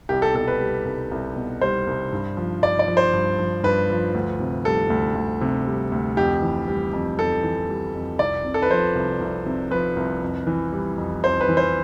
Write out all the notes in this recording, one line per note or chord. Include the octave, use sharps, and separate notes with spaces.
C2 G4
A4
B2 A4
B4
G3
C2
C2
B2
G3 C5
C2
G2
F3
G2 D5
D5
F3
C5
G2
F3
G2 B4
F3
D2
C3
G3 A4
D2
D2
C3
G3
D2
F2 G4
E3
G3
F2
F2 A4
E3
G3
F2
C2 D5
C3
A4
B4
F3 C5
C2
C2
C3
F3 B4
C2
F2
E3
G3
F2
F2 C5
B4
E3
C5